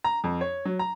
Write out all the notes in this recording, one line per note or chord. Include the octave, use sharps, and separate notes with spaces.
A#5
F2
C#5
F#3
A#5